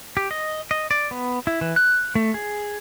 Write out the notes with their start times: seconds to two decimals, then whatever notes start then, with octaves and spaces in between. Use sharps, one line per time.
0.17 G4
0.31 D#5
0.71 D#5
0.91 D5
1.11 B3
1.47 E4
1.61 E3
1.76 F#6
2.15 A3
2.34 G#4